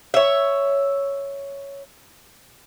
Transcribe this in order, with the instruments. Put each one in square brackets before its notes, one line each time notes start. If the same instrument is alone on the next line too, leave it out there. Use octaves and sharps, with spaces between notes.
[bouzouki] C#5 E5